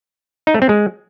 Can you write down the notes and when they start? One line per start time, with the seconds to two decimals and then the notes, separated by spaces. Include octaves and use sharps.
0.47 D#4
0.54 A3
0.62 C4
0.69 G#3